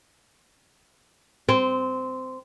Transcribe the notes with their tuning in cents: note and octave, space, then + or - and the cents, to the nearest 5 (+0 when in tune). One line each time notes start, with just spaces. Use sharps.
C4 -15